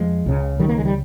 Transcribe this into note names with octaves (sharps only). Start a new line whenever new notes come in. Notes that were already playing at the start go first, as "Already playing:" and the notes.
Already playing: F2 F3 G#3
C#2 C#3
D#3 G3
A#3
G#3
G3